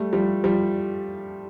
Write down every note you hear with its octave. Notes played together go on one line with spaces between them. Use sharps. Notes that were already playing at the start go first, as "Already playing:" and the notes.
Already playing: G3 A3
F3 G3
F3 G3